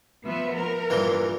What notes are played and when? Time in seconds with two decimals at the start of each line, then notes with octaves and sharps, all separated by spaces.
0.24 F3 B3 E5
0.54 A#4
0.90 G2 A#2 E3